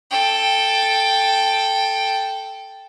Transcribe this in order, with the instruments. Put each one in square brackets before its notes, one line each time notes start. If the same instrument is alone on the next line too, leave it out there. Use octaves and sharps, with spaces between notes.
[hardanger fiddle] A4 G5